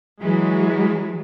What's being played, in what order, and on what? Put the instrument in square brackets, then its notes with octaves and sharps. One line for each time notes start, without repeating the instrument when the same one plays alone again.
[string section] E3 F#3 G#3